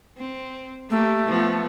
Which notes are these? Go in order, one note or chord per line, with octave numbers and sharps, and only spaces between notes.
C4
A3 A#3 G4
F3 B3